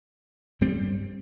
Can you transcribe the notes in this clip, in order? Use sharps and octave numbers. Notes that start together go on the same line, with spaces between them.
G2 G3 C4